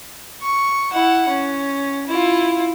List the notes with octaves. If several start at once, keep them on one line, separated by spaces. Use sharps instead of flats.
C#6
E4 F#5
C#4
E4 F4